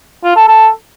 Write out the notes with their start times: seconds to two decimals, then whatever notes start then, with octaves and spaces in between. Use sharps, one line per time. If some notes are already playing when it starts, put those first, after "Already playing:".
0.24 F4
0.36 A4
0.47 A4